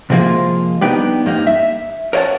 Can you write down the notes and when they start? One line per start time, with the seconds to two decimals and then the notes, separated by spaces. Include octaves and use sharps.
0.10 C3 F3 G#3 A#3 F4
0.81 G3 B3 D4 D#4 B4 G5
1.26 G2 A#3 D#4
1.47 E5
2.13 A#4 C#5 D#5 F#5 A5